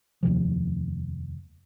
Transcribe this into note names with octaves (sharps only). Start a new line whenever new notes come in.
F1 D#2 C3 F3